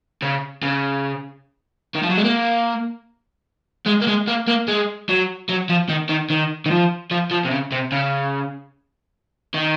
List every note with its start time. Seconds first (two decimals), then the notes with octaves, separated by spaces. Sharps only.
0.22 C#3
0.63 C#3
1.95 D#3
2.03 F3
2.10 F#3
2.17 G#3
2.24 A#3
3.86 G#3
4.02 A#3
4.07 G#3
4.27 A#3
4.47 A#3
4.68 G#3
5.09 F#3
5.49 F#3
5.69 F3
5.89 D#3
6.09 D#3
6.30 D#3
6.66 D#3
6.71 F3
7.11 F3
7.31 F3
7.45 C3
7.51 C#3
7.72 C3
7.92 C#3
9.54 D#3